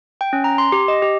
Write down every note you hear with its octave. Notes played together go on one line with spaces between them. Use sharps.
G5
C#4
A#5
C6
G4
D#5
G4